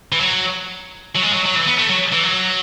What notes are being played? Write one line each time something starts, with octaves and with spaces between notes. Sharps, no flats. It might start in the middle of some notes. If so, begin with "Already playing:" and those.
E3
F#3
F#3
G#3
F#3
F#3
E3
B3
A3
F#3
E3
F#3